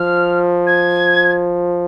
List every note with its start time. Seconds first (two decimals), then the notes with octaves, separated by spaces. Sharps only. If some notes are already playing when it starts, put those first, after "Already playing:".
Already playing: F3 F6
0.67 G#6